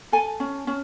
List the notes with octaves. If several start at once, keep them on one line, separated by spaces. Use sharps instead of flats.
A4 G#5
C#4
C#4